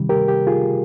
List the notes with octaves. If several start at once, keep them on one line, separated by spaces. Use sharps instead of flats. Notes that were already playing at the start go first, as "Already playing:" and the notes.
Already playing: C3 D#3 G3
G4 A#4
G4
F4 G#4